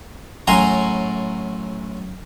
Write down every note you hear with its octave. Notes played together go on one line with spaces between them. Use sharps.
F#2 A2 G#5 A#5 C6